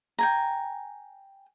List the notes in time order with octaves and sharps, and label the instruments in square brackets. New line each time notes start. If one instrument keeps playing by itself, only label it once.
[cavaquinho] G5 G#5 A#5